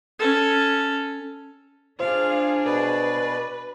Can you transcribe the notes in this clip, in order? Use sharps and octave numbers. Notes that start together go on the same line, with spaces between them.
C#4 A4
D4 F4 G#4 C5 F5
B2 B4 D5